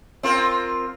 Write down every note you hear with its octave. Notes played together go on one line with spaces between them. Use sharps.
C4 F4 A#4